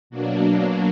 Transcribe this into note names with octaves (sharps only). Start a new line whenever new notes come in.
B2 F#3 A#3 D4